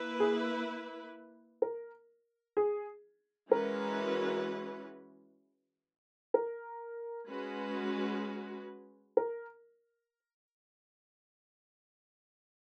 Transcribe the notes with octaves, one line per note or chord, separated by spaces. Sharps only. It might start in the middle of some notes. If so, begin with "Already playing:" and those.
Already playing: A#3 E4 B4
G#4
A#4
G#4
E3 G#3 C#4 F#4 A#4 B4
A#4
G#3 C#4 F#4 B4
A#4